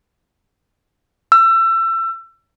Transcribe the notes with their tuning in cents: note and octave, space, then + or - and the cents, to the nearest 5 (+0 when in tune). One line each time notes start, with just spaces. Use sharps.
E6 +30